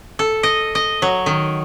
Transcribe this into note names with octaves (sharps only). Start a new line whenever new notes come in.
A4
D#5
D#5
F#3
D#3